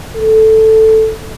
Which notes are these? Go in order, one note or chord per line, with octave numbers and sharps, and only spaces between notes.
A4